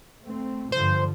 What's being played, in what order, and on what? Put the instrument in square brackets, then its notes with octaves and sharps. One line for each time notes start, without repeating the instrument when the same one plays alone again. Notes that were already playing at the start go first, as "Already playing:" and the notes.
[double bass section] A3 C4
[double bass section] G2 D3 F3 [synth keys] C5